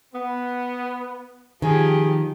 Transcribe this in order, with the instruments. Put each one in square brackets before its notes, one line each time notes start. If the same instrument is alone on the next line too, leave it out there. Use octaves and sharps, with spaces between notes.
[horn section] B3
[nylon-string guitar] D#3 [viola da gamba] F3 G4 [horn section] G#4